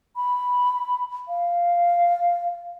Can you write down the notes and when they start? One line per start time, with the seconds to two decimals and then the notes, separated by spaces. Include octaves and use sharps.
0.16 B5
1.28 F5